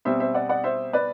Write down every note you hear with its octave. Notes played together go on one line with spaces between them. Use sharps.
B2 G3 C4 C5 E5
C5 E5
D5 F#5
D5 F#5
C5 E5
B4 D5